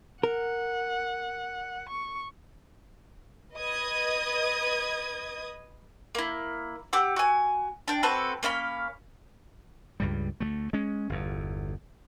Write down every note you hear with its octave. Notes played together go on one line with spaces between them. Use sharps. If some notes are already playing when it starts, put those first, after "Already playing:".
A#4 F#5
C#6
B4 D#5 D#6 G#6
A#3 E4
G4 F#5 D6 E6
F#4 G#5
D4 G5
C4 F#4 A4 B4
A#3 C#4 F5 B5
C#2 G2 G3
D2 F#3 A3
G#3 C#4
G1 E2